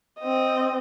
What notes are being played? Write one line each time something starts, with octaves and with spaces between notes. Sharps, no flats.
C4 D#5